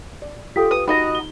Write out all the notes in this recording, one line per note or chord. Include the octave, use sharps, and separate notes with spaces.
D5
F4 G4 A4 G5 D#6 B6
B4 D#6
D#4 F#4 D#5 A#5 B5
G7